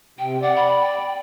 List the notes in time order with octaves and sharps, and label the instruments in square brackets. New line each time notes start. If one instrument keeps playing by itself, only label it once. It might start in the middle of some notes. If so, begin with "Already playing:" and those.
[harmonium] C3 [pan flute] G5
[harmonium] D5 [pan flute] F#5
[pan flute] B5
G5